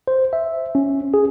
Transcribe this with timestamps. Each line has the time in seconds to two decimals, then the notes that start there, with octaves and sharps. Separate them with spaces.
0.08 C5
0.33 E5
0.75 C#4
1.14 G#4